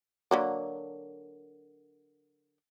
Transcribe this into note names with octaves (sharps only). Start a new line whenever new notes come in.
D3 F#3 A#3